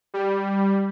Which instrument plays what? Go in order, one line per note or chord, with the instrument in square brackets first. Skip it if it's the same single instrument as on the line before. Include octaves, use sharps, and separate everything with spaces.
[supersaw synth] G3